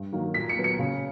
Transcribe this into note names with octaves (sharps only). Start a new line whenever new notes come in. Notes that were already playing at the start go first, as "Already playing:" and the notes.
Already playing: G2
D#3 F#3 A#3
A#2 B6
C#7
F#3 B3
C#7
C#3